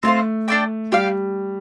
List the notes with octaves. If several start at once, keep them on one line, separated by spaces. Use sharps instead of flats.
A3 C4 F4 C5
D4 A4 D5 G5
G3 G4 D5 F5